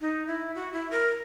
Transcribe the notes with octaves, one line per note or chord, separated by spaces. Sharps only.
D#4
E4
F#4
E4
A#4